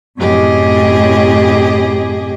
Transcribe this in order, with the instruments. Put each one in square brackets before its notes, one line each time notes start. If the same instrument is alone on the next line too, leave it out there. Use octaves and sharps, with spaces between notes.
[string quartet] F#2 A2 C3 G4 G#4 D#5